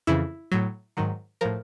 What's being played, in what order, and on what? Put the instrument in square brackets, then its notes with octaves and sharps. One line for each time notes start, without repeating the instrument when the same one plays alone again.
[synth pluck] F2 C#3 E3 E4
A2 F#3
G#2 D#3 F#3
A2 F3 A#4